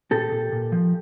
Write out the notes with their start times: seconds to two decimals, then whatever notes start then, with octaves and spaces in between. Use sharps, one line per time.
0.11 A#2 G4 A4
0.32 A#2
0.52 A#2
0.72 F3